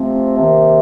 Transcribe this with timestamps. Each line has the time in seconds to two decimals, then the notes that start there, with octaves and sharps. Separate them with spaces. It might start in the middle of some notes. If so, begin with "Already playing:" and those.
Already playing: C3 F3 A3 C4
0.37 C3 D#3 A#3